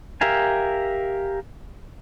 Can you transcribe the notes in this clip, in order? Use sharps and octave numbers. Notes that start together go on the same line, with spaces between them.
G4 A#4 E5 F5 G#5